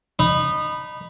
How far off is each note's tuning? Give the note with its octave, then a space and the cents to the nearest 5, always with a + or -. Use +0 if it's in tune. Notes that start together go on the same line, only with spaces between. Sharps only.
D#4 -20 B5 +0